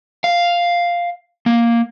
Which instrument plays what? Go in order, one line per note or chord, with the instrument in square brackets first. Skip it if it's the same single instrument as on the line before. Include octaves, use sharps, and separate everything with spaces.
[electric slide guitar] F5
A#3